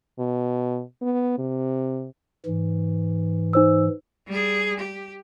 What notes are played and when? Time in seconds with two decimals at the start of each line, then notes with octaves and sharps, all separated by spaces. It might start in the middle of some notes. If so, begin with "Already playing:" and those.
0.19 B2
1.02 B3
1.38 C3
2.46 G#2 E3
3.53 D#4 C5 E6
4.27 G3 G#4
4.79 G4